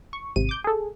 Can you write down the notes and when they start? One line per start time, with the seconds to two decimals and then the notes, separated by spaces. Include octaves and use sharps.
0.13 C#6
0.36 G#1 C3 D#7
0.49 D6 G6
0.64 G#4 A4